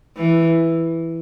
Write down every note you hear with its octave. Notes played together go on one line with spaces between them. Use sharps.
E3